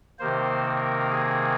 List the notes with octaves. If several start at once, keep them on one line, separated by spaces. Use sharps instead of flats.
C3 D#3 A#3 C5
A#4
G#4